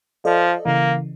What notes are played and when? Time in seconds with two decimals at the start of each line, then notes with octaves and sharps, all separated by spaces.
0.25 F3 A4 D5 D#5
0.66 C#3 E3 A#3